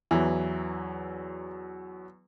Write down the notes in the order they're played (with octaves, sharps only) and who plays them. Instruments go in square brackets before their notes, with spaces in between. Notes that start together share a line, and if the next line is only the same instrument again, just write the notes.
[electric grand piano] E2 F#3 [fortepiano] E3